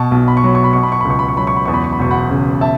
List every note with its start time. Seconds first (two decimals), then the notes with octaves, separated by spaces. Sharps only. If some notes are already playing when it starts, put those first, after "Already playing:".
Already playing: B2 A5 C#6
0.11 B1
0.28 B5
0.37 C#6
0.44 F#3 B5
0.55 C#6
0.64 B5
0.73 B2 C#6
0.83 B5
0.92 C#6
1.01 B5
1.05 C#2
1.10 C#6
1.19 B5
1.28 C#6
1.37 F#3 B5
1.47 C#6
1.57 B5
1.65 E2 C#6
1.74 B5
1.84 C#6
1.92 B5
1.99 E1 C#6
2.11 F#5 B5
2.30 C#3
2.61 E5 A5